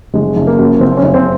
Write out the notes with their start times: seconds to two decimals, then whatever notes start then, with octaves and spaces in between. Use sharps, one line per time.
0.14 F#1 G#3
0.36 F#1
0.47 A#3
0.58 F#2
0.80 F#1 C4
0.97 C#4
1.03 F#1
1.14 C4